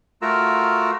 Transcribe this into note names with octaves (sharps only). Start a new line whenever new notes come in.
A3 F4 F#4 A#4 A#5 E6